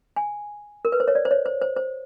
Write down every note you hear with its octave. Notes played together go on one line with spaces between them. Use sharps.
G#5
A#4
B4
C5
C#5
D5
C5
C#5
C5
C5
C5